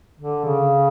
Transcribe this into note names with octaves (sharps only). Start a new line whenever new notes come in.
D3
C#3